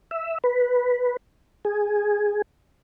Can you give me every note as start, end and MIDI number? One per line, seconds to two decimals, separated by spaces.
0.11 0.38 76
0.44 1.17 71
1.65 2.42 68